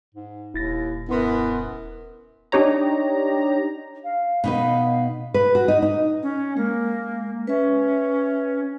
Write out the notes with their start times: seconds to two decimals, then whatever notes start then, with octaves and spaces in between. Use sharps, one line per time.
0.15 G#2
0.54 D#1 D#2 E4 A6 A#6
1.09 F#2 B3 E4 C6
2.52 D4 D#4 G4 C#5 A#5
4.04 F5
4.44 B2 D#4 B4 F5
5.34 B4
5.55 F#4
5.68 D#4
5.82 D#4
6.23 C#4
6.57 G#3 A#3
7.47 C#4 B4 E5